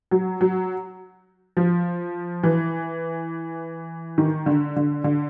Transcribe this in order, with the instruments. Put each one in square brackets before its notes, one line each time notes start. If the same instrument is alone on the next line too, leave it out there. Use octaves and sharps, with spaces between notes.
[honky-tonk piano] F#3
F#3
F3
E3
D#3
D3
D3
D3